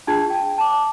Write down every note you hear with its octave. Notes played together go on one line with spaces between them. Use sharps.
D4 F4 G#4 A5 G#6
G5
A5 D6